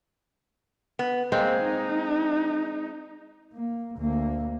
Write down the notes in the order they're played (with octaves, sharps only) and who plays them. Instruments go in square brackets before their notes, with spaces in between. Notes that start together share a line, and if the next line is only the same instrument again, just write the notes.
[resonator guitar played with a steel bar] B3
[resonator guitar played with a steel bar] G#3 [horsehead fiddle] A#3 [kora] C4
[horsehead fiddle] D#4
[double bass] A#3
D2 A#3